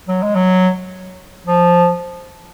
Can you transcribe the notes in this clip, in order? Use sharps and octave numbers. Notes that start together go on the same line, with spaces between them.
F#3
G#3
F#3
F3